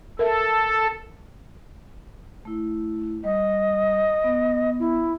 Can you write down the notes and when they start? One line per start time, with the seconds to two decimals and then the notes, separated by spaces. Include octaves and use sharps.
0.19 A4 A#4 E5
2.45 A3 E4
3.24 G3 D#5
4.24 B3
4.80 E4